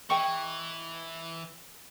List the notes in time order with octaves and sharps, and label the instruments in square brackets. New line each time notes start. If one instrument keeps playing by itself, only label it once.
[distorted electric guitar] E3 [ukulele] G#4 D#5 G5 [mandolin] C#6